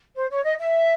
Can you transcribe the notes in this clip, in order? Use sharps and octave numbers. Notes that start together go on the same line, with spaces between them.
C5
C#5
D#5
E5